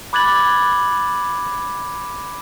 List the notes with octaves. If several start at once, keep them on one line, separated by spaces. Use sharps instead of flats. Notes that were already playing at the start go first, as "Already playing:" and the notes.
B5 D6 F#6 G#6 A6 F#7